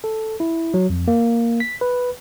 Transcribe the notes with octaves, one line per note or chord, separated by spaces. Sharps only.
A4
E4
F#3
F2
A#3
B6
B4